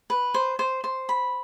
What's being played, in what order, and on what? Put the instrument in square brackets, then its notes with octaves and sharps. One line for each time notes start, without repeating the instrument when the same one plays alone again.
[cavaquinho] B4
C5
C5
C5
B5